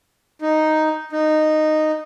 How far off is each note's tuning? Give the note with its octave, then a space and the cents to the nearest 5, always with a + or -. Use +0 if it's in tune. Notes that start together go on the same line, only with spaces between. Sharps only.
D#4 +0
D#4 -10